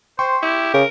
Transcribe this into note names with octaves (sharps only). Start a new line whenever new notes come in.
C5 G5 C6 C#6
E4 G4
C#3 A#4